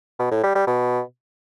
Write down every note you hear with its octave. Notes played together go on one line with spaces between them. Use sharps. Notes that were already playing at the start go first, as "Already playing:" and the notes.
B2
A2
G3
G3
B2